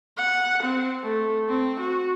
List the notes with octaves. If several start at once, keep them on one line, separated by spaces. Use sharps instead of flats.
F#5
C4
A3
C4
F#4